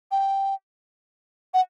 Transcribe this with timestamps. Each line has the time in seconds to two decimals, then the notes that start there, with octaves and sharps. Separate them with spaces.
0.11 G5
1.54 F#5